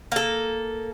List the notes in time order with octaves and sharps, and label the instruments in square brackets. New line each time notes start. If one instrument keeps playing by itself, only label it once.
[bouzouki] A#3 A4